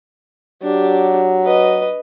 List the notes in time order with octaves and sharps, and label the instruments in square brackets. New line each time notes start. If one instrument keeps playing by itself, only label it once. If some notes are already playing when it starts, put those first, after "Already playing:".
[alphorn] F#3 [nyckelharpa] D4 G4
[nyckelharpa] B4 D#5